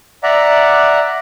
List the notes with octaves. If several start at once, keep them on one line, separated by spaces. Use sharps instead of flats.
D5 E5 F#5 A#5